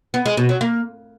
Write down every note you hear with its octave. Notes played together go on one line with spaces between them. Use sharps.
B3
G#3
B2
F#3
A#3